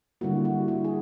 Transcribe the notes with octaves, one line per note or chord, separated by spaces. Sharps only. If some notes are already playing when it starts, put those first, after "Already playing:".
D3 G3 A#3 E4 F#4
E4 F#4
E4 F#4
G#4